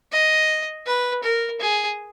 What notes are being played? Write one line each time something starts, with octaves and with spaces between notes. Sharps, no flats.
D#5
B4
A#4
G#4